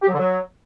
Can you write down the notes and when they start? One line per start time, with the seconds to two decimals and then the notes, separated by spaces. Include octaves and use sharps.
0.02 G4
0.07 F#3
0.12 D3
0.18 F#3